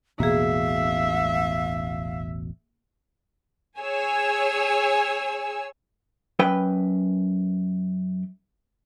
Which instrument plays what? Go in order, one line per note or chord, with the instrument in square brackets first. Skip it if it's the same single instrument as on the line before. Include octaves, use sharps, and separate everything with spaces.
[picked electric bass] E1 A1 B2 [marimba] A#3 G#4 [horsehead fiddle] E5 [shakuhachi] F5
[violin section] G#4 C#5 G#5 E6
[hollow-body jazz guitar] F#2 B4 G5 B5